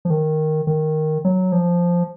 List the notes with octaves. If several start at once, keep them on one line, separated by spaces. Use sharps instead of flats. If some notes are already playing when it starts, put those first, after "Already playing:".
F3
D#3
D#3
F#3
F3